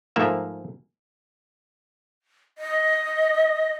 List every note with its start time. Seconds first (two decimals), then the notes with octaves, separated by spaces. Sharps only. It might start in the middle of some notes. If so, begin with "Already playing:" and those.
0.16 G#2 F3 A3 A#3 E5
2.58 D#5